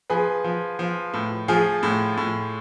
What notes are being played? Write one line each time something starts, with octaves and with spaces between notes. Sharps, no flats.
F3 G#4 B4
F3
F3
A2
F3 F4 G#4
A2
A2